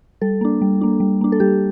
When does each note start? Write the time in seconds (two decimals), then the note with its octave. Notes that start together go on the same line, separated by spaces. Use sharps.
0.22 G3 A4
0.41 A#3 D4
0.62 G3
0.81 A#3 D4
1.00 G3
1.21 A#3 D4
1.32 A4
1.40 G3 G4